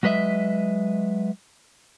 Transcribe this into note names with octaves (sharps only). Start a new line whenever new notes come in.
F#3 G#3 B4 D#5 E5